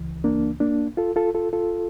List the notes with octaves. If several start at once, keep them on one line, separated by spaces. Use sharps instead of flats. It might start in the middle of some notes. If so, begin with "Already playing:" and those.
Already playing: C#2 C#3 E3
A#3 D4
A#3 D4
F4 A4
F4 A4
F4 A4
F4 A4